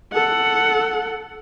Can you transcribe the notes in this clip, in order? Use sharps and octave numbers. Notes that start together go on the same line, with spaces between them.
A4 F#5